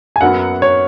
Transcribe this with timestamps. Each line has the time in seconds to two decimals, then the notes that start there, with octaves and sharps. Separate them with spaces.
0.16 G#5
0.21 F#2 F#3 B3 F#5
0.62 C#5